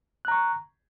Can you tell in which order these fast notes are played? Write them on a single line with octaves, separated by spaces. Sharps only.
F#6 A#5 C#6